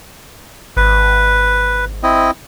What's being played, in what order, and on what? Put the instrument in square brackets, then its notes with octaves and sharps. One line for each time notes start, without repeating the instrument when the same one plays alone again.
[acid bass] G#1 [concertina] B4
[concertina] C4 E4 D#5